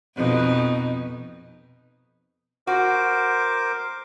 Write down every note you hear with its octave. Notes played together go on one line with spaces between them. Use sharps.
F2 B2 D#4
F#4 A#4 C5 D6